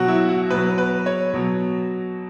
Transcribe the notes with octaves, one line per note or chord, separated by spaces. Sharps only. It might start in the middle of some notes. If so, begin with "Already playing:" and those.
Already playing: B2 F#3 F#4
E4
F#4
B2 F#3 B4
B4
C#5
B2 F#3